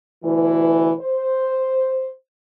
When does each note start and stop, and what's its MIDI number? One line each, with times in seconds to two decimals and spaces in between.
0.24 0.91 38
0.24 0.91 47
0.24 0.91 52
1.00 2.10 72